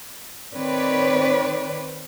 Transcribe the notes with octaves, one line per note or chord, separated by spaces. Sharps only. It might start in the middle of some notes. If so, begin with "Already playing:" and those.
D#3 C4 B4 C#5 D5